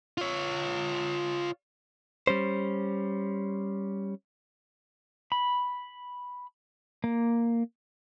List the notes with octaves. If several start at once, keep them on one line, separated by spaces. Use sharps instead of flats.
F4 C#5
G3 C#4 C5
B5
A#3